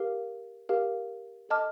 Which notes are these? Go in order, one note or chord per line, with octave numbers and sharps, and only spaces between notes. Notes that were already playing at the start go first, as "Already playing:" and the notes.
Already playing: G4 A#4 F5
G4 A#4 F5
A4 D#5 A5 D6 F6